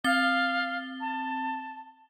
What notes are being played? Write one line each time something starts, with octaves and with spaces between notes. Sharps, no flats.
C4 F5 A6 G7
A5